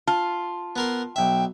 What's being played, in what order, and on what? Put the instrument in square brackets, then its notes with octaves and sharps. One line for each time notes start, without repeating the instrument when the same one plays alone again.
[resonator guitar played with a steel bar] F4 [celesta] A5
[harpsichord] B3 A#4 C6
[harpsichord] B1 E5 [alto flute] G5